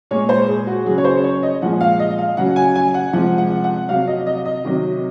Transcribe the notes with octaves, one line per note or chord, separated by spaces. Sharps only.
A#2 G#3 C#5
C5
G#4
F#4
C#3 F#3 G#4
C#5
C5
C#5
D#5
A#2 F3 G#3 F#5
F5
D#5
F5
C#3 F#3 F#5
G#5
G#5
F#5
C3 F3 G#3 F#5
F#5
F#5
C3 F#3 F5
D#5
D#5
D#5
C3 D#3 F#3